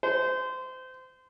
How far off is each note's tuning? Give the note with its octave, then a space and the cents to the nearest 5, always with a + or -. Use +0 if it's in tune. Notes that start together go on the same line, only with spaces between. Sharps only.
C5 -25